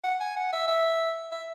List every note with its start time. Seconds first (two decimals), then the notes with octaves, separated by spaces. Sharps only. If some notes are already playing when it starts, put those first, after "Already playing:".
0.04 F#5
0.20 G#5
0.37 F#5
0.53 E5
0.68 E5
1.32 E5